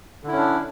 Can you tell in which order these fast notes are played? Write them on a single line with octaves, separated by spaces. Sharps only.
D3 E4 C#4 D4